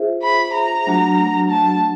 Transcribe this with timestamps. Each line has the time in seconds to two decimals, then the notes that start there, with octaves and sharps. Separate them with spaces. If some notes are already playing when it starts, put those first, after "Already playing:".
Already playing: F4 G#4 C5 E5
0.22 B5
0.54 A#5
0.87 F#3 A3 D4 F#4
1.50 A5